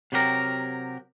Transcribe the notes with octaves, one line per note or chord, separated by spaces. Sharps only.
C3 F#3 G4 A#4